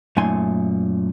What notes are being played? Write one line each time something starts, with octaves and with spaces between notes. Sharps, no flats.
F#2 A#2 A3 D#4 G#5 C6